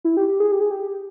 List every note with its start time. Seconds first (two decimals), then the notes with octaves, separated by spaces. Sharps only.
0.05 E4
0.17 G4
0.28 G4
0.40 G#4
0.52 G4
0.61 G#4
0.71 G4